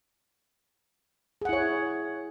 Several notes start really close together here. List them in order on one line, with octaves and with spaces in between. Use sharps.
G#4 F#5 E4 C#5